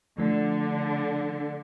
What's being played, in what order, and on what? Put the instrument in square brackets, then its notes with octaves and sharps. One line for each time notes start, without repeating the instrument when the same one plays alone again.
[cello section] D3 [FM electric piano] F3 A3